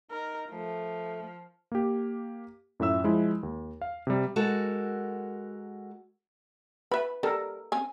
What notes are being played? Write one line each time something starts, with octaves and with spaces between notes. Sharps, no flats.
D#4 A#4
F3 A3
A#3 G4
F#2 A2 F4 E5 E6
F3 G#3 E4
D#2
F5
C3 G3
G#3 F#4 A4 A#4
B4 E5 B5
G3 A4 A#4
C4 C#4 G#5